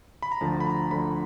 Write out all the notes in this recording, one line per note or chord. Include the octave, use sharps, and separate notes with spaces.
B5
A#5
D2 D3 F3 A5
B5
A#5
D2 D3 F3 B5